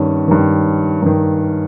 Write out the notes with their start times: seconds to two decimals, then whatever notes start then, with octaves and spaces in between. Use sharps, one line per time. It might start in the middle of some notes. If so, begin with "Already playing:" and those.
Already playing: G2 D#3 C#4
0.28 G2 D#3
1.02 G2 D#3